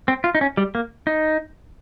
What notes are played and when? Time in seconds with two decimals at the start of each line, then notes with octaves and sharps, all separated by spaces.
0.08 C4
0.24 F4
0.35 D#4
0.41 C#4
0.57 G3
0.75 A#3
1.07 D#4